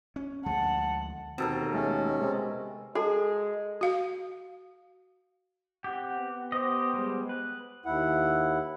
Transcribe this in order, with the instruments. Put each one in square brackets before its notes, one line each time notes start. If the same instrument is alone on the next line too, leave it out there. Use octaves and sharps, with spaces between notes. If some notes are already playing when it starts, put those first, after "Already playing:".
[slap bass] C#4
[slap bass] D2 F3 G#3 [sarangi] F#5 [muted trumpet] A5
[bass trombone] D#2 [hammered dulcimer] B2 A4 A#4 [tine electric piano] C4
[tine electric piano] G#3 A3 [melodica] C#4
[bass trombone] C3 [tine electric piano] G#3
[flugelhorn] G#3 [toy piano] F#4 A4 A5 [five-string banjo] G#4
[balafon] F#4 F5
[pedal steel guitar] C4 G4 [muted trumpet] F#5
[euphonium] B3
[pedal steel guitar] G4 D#5 [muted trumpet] C5
[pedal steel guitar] G3 G#3
B4
[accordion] D#2 E4 F#5